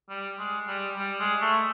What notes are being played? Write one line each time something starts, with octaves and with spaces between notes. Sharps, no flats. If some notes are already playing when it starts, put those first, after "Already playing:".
G3
G#3
G3
G3
G#3
A3